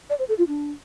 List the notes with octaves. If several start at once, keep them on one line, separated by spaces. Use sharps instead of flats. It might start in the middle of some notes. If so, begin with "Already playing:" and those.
D5
C5
A4
F4
D4